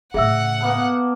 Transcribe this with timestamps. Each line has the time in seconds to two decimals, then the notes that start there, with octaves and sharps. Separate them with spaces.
0.14 A2 C#3 G#4 E5 F#5 E6
0.60 A#3 B3 A4